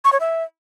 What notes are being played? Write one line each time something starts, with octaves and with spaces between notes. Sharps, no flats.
C#6
C#5
E5